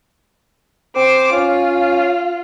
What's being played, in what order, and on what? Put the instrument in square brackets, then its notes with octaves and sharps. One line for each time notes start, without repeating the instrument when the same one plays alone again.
[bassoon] C4 [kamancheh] C5 D6
[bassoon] C#4 [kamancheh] F4